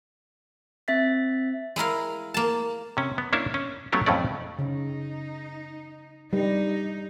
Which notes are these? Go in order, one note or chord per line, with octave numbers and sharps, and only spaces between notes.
C4 E5 A6 B6
G#3 E4 A#4 F5
A#3 A5
C3 C#4
B3
A#3 C#4 D4 E4 E5 F5
C#4
F#3 A3 B3 C#4 F4 G4
F2 A2 F#3 A3 C#4 D5
C#3 D#4
G3 D#4